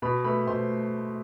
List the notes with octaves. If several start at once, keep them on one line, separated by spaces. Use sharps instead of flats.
B2 B4 B5
A3 B4 B5
B2 C5 C6